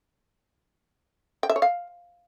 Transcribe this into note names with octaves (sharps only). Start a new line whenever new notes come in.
G5
E5
C#5
F5